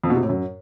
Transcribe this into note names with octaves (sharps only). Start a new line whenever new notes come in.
F2
B2
C3
A2
F#2